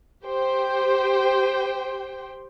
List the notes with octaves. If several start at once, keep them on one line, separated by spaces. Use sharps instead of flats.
G4 C5 G5